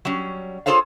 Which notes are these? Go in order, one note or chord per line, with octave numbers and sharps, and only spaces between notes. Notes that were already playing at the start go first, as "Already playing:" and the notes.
F#3 G3 C#4
F4 G#4 A4 C5 C#5 F5